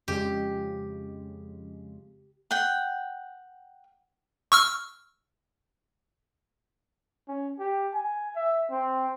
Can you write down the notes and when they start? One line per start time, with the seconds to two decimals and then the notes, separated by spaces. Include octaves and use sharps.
0.08 F2 C#3 G#3 G4
2.51 F#5 G5
4.52 C#6 E6 F6
7.28 C#4
7.59 G4
7.94 G#5
8.36 E5
8.71 C4